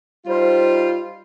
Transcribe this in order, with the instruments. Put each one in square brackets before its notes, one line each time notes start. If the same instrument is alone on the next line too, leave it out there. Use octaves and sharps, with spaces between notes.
[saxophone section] G3 F4 [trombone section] D#4 C5